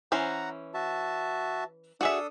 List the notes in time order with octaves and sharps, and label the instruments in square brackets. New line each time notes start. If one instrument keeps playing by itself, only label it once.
[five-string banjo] E3 C#4 C5 [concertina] F#5 A#5
[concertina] F#4 E5 A5
[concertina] D4 A4 D#6 [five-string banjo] F#4 G#4 E5